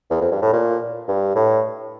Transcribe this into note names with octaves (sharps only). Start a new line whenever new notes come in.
E2
F2
G2
A2
A#2
G2
A2